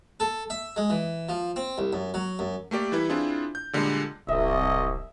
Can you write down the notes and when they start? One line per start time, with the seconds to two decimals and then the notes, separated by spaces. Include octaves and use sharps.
0.20 A4
0.50 E5
0.76 G#3
0.90 E3
1.29 F3
1.56 C4
1.78 C2
1.93 F#2
2.14 F#3
2.39 F#2
2.71 A3 A#3 G4 D5
2.92 E3 G3 E4 B4
3.09 C4 D4 E4 F4 G#4
3.55 G6
3.73 A#2 D3 G3 G#3
4.28 D1 C2 D#5 E5